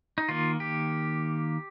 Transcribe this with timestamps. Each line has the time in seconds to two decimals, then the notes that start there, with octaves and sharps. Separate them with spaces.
0.18 D#4
0.29 D#3 A#3 F4
0.60 G4